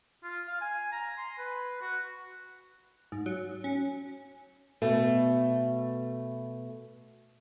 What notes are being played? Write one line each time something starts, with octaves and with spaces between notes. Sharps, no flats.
F4
F5
G#5
A#5
C6
B4
F#4
G#2
F#3
C#4
B2 A3